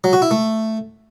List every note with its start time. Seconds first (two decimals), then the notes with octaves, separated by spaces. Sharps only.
0.04 F#3
0.13 F#4
0.22 E4
0.31 A3